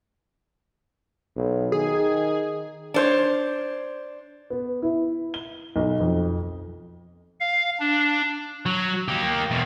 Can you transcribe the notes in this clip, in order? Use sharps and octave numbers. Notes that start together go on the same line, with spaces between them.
B1
D#3 G#4
D4 C5 C#5
B3
E4
G7
B1
F2
F5
D4
F#3
A#3 G4
E2 B2